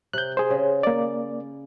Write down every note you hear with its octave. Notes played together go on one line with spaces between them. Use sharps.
C3 F#6 G6
G#4 C5
C#3
A#3 D5